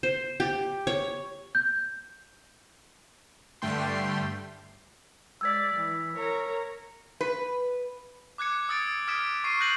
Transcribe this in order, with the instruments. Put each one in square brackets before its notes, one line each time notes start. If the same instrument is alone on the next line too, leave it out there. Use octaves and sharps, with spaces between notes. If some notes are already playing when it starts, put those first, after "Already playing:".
[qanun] C5
G4
C#5
[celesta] G6
[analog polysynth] G2 D3 G3 A3 G5 C6
[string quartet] G#3 D5 [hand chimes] E6 G#6 B6
[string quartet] E3
A#4 C#5 A#5
[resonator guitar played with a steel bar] B4
[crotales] D6 F#6 G#6 C#7
D#6 E6 G#6 A6 C#7 D7
D#6 F6 G#6 B6 D7 E7
C#6 C7 D#7
F#6 G6 A#6 D#7 F#7